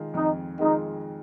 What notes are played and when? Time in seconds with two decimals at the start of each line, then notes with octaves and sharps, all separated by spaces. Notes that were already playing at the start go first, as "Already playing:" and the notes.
Already playing: D#3 G#3 F4 G#4
0.14 F2 D#4
0.59 D#3 G#3 D#4 F4 G#4